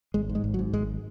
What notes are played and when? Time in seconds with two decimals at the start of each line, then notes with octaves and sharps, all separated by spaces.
0.14 G#1 G#3
0.29 G#2
0.35 G#3
0.44 G#1
0.54 F#3
0.59 G#2
0.73 G#1 G#3